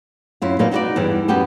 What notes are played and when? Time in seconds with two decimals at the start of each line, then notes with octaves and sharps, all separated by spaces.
0.42 F#2 E4 F4
0.59 A#2 F#3 D#4 A#4 B4 F5
0.72 D#4 E4 F#4 G4 B4 D5
0.96 E2 G2 E3
1.28 F#2 B3 G4 A5